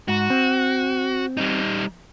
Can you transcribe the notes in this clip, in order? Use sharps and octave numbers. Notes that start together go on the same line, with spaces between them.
G#2 F#4
C4
G3 D#4